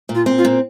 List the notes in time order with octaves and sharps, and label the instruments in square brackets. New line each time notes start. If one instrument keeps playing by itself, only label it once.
[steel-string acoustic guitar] A#2
[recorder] F4
[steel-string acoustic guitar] C4
[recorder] F4
[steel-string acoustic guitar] A#2